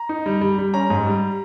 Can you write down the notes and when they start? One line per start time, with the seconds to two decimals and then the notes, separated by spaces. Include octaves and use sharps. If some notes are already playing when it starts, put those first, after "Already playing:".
Already playing: A#5
0.09 D#4
0.26 G3
0.41 G3
0.58 G3
0.74 C#4 A#5
0.90 G#2
1.07 G3